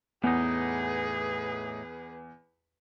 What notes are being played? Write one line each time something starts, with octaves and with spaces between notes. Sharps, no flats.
E2 A2 B3 D#4 G#4 B4